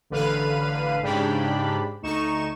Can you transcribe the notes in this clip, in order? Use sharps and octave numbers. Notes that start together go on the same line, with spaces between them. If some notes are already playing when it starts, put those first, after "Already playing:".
A1 D3 B4 F5 D#7
G#2 C#3 D4 G4 B5
D2 D#4 C#6 E7